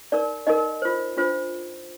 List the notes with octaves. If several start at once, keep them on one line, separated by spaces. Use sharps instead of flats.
D#4 A#4 D5
D#4 A#4 D#5
F4 C5
D4 F4 C5